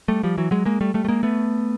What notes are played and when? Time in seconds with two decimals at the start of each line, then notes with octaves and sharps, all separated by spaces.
0.08 G3 A3
0.23 F3 G3
0.38 E3 F#3
0.51 F#3 G#3
0.65 G#3 A#3
0.81 G3 A3
0.94 G3 A3
1.05 A3
1.08 G#3 A#3
1.23 A3 B3